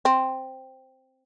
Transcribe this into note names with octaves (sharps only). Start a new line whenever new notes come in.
C4